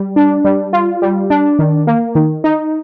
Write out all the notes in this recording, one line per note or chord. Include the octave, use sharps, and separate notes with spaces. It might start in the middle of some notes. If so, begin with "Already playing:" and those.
Already playing: G3
D4
G3
F4
G3
D4
D#3
A#3
D#3
D#4